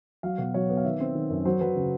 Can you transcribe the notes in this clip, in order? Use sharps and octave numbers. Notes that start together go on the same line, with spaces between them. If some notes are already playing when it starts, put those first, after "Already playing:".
F#3 F5
B2 F#5
F#3 C#5
B3
F5
D#3 E5
C4
D#3
F#2
F#3 C5
F#3 B4
C#3